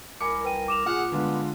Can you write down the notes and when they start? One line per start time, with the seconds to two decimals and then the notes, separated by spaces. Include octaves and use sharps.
0.21 C2 A#4 G#5 B5 D6 C#7
0.44 B4 G5 D#7
0.68 D6 E7 F7
0.85 A#2 G#4 F#5 F6
1.12 D3 G3 G#3 B3 F4 B4